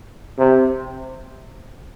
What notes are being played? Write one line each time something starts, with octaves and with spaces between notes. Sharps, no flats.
C3